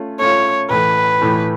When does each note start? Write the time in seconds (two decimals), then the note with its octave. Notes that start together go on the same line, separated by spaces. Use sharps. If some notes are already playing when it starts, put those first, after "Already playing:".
Already playing: A3 C#4 F4
0.19 A3 C#4 F4 C#5
0.70 A2 E3 A3 B4
1.22 A2 E3 A3